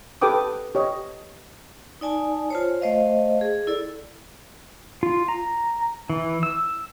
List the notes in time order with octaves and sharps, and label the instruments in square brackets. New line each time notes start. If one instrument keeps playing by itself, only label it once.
[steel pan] G4 A4 B4 G5 D6 D#6
G4 C#5 D#5
[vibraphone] D#4 D5 G#5 A5
F4 C5 C#5
A3 C5 D#5 F5
G#4
E4 A4 D5
[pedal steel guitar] F4
A#5
E3
E6